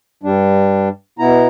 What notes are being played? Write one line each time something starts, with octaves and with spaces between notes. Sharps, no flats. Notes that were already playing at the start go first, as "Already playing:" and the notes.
G2 G3 D4
B2 B3 E4 A#5